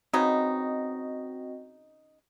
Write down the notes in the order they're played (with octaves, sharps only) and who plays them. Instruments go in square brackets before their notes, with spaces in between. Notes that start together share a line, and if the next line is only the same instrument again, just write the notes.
[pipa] C#3 B3 D#4 [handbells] C4 F#4 D#5